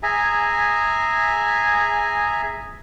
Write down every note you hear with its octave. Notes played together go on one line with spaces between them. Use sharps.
G#4 E5 G#5 A#5